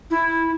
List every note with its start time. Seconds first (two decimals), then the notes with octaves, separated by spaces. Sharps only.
0.11 E4